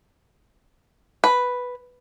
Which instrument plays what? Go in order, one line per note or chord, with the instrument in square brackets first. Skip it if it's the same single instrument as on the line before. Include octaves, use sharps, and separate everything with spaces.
[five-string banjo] B4